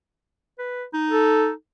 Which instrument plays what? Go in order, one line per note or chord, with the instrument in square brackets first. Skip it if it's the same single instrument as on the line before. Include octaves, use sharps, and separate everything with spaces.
[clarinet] B4
D#4
[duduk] A4